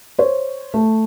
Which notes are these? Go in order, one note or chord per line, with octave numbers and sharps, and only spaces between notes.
C5 C#5
A3